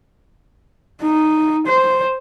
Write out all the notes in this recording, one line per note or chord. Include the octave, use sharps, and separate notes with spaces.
D#4
C5